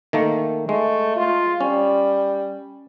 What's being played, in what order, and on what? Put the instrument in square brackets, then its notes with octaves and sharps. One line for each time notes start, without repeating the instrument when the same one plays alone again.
[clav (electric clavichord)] D#3 A3 A#3
[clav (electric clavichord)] G#3 [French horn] A3
[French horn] F4
[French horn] G3 [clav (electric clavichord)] C#4